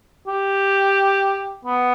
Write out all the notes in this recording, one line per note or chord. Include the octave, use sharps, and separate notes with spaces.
G4
B3